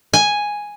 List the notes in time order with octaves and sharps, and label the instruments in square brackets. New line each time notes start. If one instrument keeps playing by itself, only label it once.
[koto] G#5